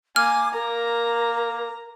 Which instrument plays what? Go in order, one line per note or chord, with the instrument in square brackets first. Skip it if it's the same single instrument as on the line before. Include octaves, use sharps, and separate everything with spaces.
[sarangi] A#3 [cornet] G#5 [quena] D6 [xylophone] F6
[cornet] A#3 [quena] A#4 [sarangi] A#5